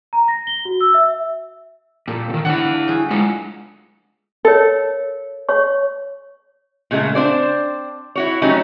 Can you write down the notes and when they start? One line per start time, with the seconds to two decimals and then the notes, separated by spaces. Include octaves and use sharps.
0.13 A#5
0.28 A#6
0.47 G7
0.65 F#4
0.81 E6
0.94 E5
2.08 A#2 G3 A4
2.30 B2 D#3
2.45 D3 D4 E4 F4 F#5
2.88 G3 F#4 G#4
3.11 G#3 F4 D#5 F#5
4.45 A4 A#4 C#5
5.49 C#5 C#6
6.91 A#2 C#3 G#3 A3
7.15 C4 D4 C5 D5
8.15 E4 F#4 C#5
8.42 F#3 G3 A3 C#4 D#4